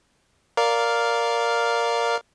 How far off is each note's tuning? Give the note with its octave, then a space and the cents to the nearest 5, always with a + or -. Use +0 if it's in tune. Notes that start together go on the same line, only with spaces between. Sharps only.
A#4 +0 D5 -10 F5 +0